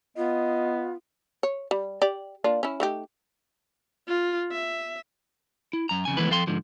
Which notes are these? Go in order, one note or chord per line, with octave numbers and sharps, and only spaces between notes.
B3 F4 D#5
C#5
G3
G4 D5
A#3 D4 F4
C#4 E4
A3 D#4 G4
F4
E5
E4
F#2 A#5
F2 C#3 G#5
E3 G#3 A3 B3 E4 B4
F2 F3 A4 F5 G5 C6
G#2 D3 F3